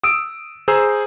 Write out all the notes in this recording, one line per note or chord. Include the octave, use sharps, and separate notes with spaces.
D#6 E6 D7
G#4 C5 A#5 E6